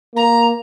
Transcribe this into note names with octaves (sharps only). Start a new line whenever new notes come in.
A#3 A#5